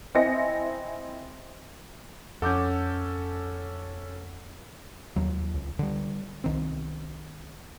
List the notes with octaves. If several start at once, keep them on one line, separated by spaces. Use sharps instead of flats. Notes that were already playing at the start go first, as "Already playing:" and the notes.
C4 E4 D#5 G#5 A#6 C#7
F2 C#4 A4 F#5 D6 G6
D#2 F#3
C#2
D3 G3
C2 D#3 C4